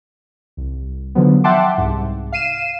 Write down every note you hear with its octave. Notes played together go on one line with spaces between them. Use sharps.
C2
D3 D#3 F3 F#3 B3
E5 F#5 G5 A5 C6 D6
C2 G#2
F5 C7 D#7 E7